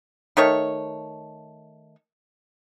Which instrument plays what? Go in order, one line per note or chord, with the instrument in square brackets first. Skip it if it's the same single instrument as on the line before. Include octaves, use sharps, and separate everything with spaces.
[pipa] D#3 A3 C#5 C#6